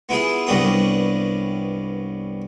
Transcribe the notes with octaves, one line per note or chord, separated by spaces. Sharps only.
B3 E4 F4 G#4
C2 G2 F#3 G3 B3 D#6